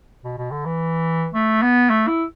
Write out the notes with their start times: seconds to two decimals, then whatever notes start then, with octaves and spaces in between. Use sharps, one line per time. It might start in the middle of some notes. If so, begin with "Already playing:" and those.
0.25 B2
0.38 B2
0.51 D3
0.66 E3
1.34 A3
1.62 B3
1.90 A3
2.08 E4